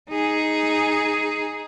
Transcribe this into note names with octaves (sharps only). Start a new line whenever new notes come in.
D#4 G#4